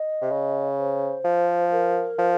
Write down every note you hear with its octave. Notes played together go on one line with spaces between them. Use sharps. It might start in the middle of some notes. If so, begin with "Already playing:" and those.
Already playing: D#5
C3
C#3
C5
F3
A#4
F3